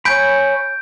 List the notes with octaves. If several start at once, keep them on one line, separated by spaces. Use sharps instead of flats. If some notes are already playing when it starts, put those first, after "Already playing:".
C#5 G#5 B5 G6 D7